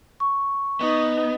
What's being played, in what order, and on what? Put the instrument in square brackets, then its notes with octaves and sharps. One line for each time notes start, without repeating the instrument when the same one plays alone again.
[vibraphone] C#6
[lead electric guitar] B3 [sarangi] D#4